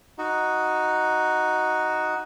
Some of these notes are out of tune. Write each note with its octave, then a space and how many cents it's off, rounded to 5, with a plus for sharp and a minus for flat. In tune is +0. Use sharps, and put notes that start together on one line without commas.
D#4 +5 F#4 +0